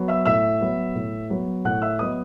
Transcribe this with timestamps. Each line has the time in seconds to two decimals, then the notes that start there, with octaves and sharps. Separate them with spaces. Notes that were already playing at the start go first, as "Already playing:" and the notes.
Already playing: F#3 B3
0.08 E5 E6
0.25 A2 E5 E6
0.61 F#3 B3
0.95 A2
1.30 F#3 B3
1.65 A2 F#5 F#6
1.82 E5 E6
1.99 F#3 B3 D#5 D#6